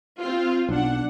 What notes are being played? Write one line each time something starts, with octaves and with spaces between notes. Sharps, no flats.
C4 F4
B1 D4 F#5